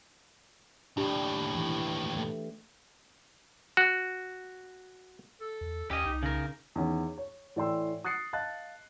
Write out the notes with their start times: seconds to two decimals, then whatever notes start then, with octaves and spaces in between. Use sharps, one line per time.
0.97 D#2 A2 D4 G4
1.55 E3
2.17 A3
3.77 F#4
5.41 A4
5.61 E2
5.91 D#2 C#4 G4 D#5
6.06 C2 D#4
6.23 C#3 A#4
6.76 E2 D#3 C#4
7.18 C#5
7.56 A2 E3 D5 G5 C6 E6
8.05 D#6 F#6 A6 C7 C#7
8.33 D#5 F5 A5 F#6 A6